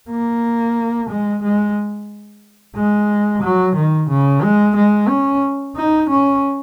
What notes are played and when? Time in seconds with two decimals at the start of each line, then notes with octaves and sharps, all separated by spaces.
0.10 A#3
1.10 G#3
1.43 G#3
2.76 G#3
3.43 F#3
3.76 D#3
4.10 C#3
4.43 G#3
4.76 G#3
5.09 C#4
5.76 D#4
6.10 C#4